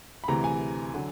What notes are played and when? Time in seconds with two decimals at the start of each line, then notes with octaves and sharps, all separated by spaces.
0.24 B5
0.28 D2 C3 E3 A#5
0.44 G#5
0.94 D3 F#3